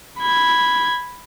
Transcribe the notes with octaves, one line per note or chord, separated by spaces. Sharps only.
B5 G#6